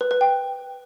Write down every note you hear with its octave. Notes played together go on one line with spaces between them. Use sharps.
B4
B4
G5